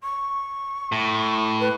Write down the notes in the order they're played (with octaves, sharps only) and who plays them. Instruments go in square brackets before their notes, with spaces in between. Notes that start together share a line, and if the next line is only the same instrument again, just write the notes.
[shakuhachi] C#6
[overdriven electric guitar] A2
[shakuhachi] B4